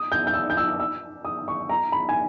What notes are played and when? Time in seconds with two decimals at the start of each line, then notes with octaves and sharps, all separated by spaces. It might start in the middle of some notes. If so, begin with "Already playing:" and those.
Already playing: D#6
0.12 G6
0.27 G6
0.34 E6
0.50 G6
0.57 E6
0.80 E6
1.25 D#6
1.48 C#6
1.69 A#5
1.92 B5
2.09 G#5